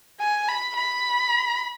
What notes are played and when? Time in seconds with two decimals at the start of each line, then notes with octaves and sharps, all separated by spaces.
0.20 G#5
0.48 B5
0.75 B5